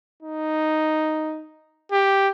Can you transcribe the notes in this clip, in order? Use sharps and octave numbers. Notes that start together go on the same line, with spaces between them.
D#4
G4